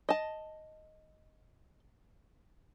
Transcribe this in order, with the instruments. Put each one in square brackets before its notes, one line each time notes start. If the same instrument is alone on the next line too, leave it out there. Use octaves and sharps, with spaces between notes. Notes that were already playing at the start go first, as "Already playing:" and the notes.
[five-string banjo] D#5 A5